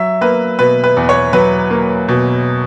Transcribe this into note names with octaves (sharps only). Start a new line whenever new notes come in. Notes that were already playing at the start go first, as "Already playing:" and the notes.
Already playing: F#3 E5
A#3 B4
B2 B4
B4
E2
C#5
F#3 B4
A#3
B2